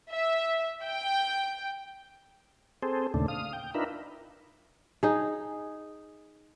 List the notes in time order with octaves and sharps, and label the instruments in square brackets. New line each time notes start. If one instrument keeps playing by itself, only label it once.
[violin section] E5
G5
[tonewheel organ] C4 G#4 A4 C5
D#2 A#2 C#3 A3 D4
F5 D#6
G5
D4 D#4 F4 A#4 B4 E5
[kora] D#4 G#4